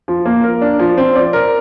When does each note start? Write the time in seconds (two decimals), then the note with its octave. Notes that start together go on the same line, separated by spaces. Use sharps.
0.08 F3
0.25 A#3
0.44 A#4
0.61 D4
0.80 F3
0.98 C4
1.15 D5
1.33 A#4